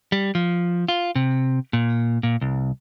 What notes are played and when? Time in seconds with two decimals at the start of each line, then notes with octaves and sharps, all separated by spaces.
0.12 G3
0.35 F3
0.88 F4
1.15 C3
1.73 A#2
2.23 A#2
2.41 C2